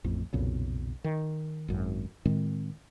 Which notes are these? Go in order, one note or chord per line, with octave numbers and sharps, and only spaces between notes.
A1 F2
B1 F2 A#2 C#3
D#3
G#1 F#2
A2 D#3 G#3 C4